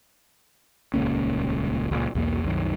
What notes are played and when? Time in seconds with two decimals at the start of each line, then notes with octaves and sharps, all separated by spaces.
0.94 D#1 C#2 A#3 C#4
1.91 C#2 A#2
2.15 B1 E2 A#3
2.44 C2 F#2 D#3